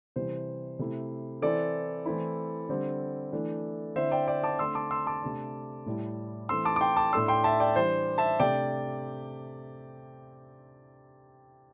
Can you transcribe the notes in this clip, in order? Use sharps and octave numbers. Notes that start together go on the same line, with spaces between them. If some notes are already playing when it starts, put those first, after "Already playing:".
C3 E3 G3 C5
C3 A3 E4
E3 C4 E4 A4 D5
E3 A3 C4 E4
D3 G3 C4
E3 A3 D4
D3 C4 E4 C5 E5
D5 G5
D5 G5
A5 D6
D3 A3 C4 C6 E6
A5 D6
C6 E6
A5 D6
C3 A3 D4
A2 G3 E4
E3 A3 C4 C6 E6
A5 D6
D6
G5 C6
A5 D6
A2 A3 D4 C6 E6
G5 C6
E5 A5
D5 G5
E3 G3 D4 C5
E5 A5
C3 A3 D4 D5 G5